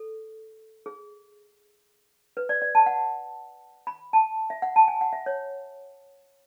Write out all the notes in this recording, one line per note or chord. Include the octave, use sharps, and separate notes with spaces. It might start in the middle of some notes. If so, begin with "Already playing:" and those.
Already playing: A4
G#4
B4
D5
D5
A5
F#5
B5
A5
E5
F#5
A5
G#5
F#5
E5
C#5